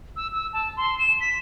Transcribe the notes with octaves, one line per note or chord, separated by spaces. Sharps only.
E6
E6
A5
C6
E7
B6